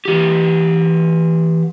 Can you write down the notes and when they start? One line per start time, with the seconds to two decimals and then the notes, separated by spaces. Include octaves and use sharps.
0.05 E3 G4